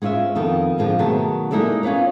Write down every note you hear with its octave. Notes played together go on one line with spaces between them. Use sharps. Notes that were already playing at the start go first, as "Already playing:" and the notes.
G#3 C#4 F4 B4 E5
F2 D#3 B3 A4
D3 F3 G#3 C4
B2 D#3 F#3 A3 G#4 A5
G#3 A#3 D#4 E4 A4 D5
C#4 F4 B4 C#5